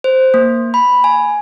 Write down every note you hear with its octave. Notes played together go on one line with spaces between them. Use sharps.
C5
A#3
B5
G#5